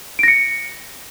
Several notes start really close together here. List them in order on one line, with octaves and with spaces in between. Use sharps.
D7 A#6 C#7